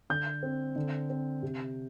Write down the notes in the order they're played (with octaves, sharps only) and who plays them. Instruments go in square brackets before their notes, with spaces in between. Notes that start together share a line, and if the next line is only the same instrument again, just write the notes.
[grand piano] D3 G6
C4
D3
C4
C3